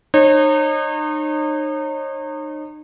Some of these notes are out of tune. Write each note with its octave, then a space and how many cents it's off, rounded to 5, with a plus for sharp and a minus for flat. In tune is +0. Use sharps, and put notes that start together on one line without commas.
D#4 -35 C#5 -40